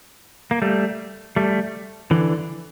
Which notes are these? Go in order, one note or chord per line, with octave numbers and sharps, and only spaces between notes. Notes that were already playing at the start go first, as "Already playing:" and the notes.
A#3
G3 A3
G3 A3
D3 E3